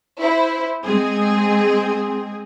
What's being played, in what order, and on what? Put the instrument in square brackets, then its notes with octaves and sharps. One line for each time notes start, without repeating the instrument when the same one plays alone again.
[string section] E4 C5
G#3 C4 G#4